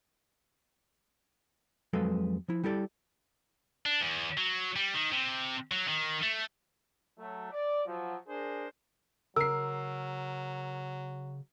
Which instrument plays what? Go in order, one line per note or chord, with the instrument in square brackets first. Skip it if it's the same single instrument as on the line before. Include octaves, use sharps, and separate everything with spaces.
[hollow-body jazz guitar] F2 F#3 G#3 A4 B4 F5
F3 E4
G3 E4 G4 A4 D5
[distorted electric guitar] D4
E2
F#3
G3
D#3
C3
F#3
D#3
A3
[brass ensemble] F#3 A3
D5
F3 F#3
D4 G#4 A#4 C5
[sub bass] C#3 [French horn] F#3 [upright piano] A#4 C7 [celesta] E6